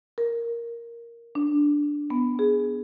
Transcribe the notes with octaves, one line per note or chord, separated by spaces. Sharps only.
A#4
D4
B3
G#4